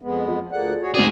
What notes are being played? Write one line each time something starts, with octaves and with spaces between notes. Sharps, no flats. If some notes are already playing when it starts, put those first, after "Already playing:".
F2 G#3 B3
F3
D2 A#3 G#4 A4 D5 F#5
F#4 G#4 C#5
D2 G#2 C4 F#4 G#4 D5 F#5